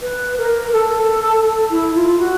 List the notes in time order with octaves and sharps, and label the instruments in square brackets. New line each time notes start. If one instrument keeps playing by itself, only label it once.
[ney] B4
A#4
A4
E4
F4
F#4